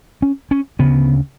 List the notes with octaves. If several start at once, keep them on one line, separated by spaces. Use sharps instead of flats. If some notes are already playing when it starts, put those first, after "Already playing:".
C#4
C#4
D2 C#3 B3